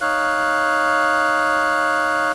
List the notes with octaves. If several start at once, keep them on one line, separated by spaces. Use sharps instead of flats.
D#4 C#5 F5 F#6